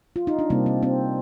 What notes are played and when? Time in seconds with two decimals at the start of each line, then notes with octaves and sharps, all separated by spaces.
0.16 F4
0.27 D#4
0.39 D4
0.50 C3 G3 A#3 C4
0.66 C4
0.83 C4